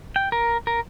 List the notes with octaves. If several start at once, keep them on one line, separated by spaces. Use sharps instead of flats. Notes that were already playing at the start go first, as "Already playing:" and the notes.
G5
A#4
A#4